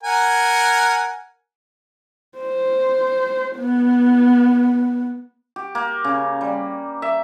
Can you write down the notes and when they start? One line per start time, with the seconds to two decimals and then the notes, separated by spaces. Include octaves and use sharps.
0.03 A#4 F#5 G#5
2.38 C5
3.57 B3
5.56 G4
5.75 A#3
6.04 C#3
6.41 G3
7.02 E5